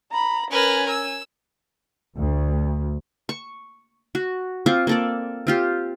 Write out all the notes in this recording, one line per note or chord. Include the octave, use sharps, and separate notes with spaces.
A#5 B5
C#4 A#4 B4 G#5
E6
D2
C#6
F#4
C4 F4 C#6 D6
A#3 A4 D5
C4 F4 G4